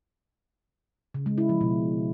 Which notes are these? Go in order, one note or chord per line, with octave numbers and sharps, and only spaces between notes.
C#3
G#3
E4
F3
B2